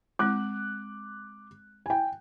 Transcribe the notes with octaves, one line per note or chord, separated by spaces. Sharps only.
G#3 C4 D6 F#6
G5 G#5